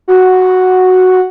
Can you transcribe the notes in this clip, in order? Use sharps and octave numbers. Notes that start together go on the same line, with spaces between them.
F#4